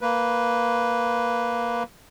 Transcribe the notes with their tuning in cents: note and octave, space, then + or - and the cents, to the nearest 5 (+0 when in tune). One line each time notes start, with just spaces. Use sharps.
A#3 +0 B4 +0